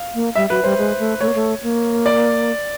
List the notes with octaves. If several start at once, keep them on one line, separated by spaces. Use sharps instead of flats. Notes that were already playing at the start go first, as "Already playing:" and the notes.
Already playing: F5
A#3
G3 E5
F#3 B4
G3 C5
G#3
A3
A3 C#5
A#3
A3
A#3
D5